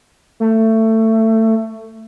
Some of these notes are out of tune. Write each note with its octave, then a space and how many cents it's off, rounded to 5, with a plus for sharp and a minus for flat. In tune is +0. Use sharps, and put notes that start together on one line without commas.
A3 +20